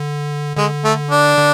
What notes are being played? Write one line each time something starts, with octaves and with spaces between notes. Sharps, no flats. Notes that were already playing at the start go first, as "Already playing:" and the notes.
Already playing: D3
D3 G#3
A3
D4
D3